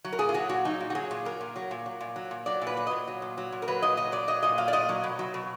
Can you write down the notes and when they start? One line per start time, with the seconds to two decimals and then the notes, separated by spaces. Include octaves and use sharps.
0.04 F#3
0.13 A#4
0.19 A#2 G#4
0.29 F4
0.34 F#3 F#4
0.49 A#2 F#4
0.65 F#3 D#4
0.81 A#2
0.90 F#4
0.95 F#3 G#4
1.11 A#2
1.25 F#3 A#4
1.41 A#2
1.56 F#3
1.71 A#2
1.86 F#3
2.01 A#2
2.16 F#3
2.31 A#2
2.46 F#3 D5
2.62 A#2
2.67 B4
2.77 F#3
2.87 A#2 D#5
3.07 F#3
3.22 A#2
3.37 F#3
3.52 A#2
3.62 A#4
3.68 F#3 B4
3.82 A#2 D#5
3.97 F#3 D#5
4.12 A#2 D5
4.28 F#3 D#5
4.43 A#2 D#5
4.58 F#3 F5
4.68 D5
4.73 A#2 D#5
4.89 F#3
5.04 B2
5.19 F#3
5.34 B2